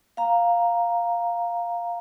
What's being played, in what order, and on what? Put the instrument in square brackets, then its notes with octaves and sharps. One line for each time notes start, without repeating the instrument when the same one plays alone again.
[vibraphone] F5 A#5